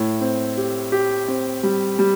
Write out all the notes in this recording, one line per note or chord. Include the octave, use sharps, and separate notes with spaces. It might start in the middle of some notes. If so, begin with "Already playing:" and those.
Already playing: A2
C4
G4
G4
C4
G3
G3